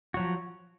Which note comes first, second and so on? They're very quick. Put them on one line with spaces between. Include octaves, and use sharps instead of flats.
F#4 F#3 F3